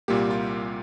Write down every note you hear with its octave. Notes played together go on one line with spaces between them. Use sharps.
C2 A#2 G3 A#3 G4
F4